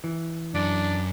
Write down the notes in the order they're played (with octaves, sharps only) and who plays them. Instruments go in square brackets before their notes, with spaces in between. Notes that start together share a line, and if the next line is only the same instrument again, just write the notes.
[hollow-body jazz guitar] E3
[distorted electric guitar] F#2 [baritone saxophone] D4